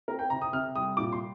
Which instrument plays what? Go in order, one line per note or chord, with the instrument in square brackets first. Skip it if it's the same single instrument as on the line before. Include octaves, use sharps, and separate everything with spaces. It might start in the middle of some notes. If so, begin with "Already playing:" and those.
[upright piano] C4 A#4
G5
C3 A#5
D#6
C3 F6
G3 D#6
A#2 D6
C6